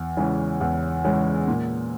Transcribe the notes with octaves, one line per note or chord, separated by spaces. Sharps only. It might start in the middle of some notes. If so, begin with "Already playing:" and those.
Already playing: E2
C#3 E3 G#3 C#4
E2
C#3 E3 G#3 C#4
A#2